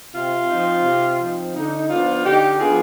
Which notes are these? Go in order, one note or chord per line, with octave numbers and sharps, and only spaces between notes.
C3 F4
F3 C4 D#4
C3
F3 C4 D#4
D3 D#4
F3 B3 D4 F4
D3 D#4 G4
F3 B3 D4 F4 G#4